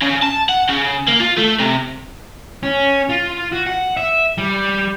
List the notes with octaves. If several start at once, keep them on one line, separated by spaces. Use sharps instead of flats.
C#3
A5
F#5
C#3
A#3
F4
A3
C3
C#4
F4
F#4
F#5
E5
G3